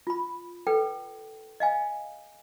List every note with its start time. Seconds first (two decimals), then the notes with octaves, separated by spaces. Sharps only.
0.07 F4 B5
0.67 A4 B4 G5
1.60 D#5 F5 G#5